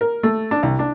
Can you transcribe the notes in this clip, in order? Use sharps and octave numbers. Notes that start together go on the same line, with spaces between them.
A#4
A3
D4
C2
D4